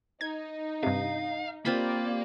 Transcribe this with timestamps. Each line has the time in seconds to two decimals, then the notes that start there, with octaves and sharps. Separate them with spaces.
0.21 D#4 G#6
0.83 G2 C3 F5
1.65 A#3 C4 F4 G4 A#4 D5 B5